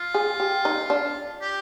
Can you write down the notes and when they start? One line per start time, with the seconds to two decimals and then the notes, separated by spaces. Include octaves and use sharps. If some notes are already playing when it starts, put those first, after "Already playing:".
Already playing: F4
0.14 G#4
0.40 G4
0.65 D#4
0.90 D4
1.41 G4